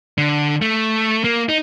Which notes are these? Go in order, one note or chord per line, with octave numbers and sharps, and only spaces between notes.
D3
A3
A#3
D#4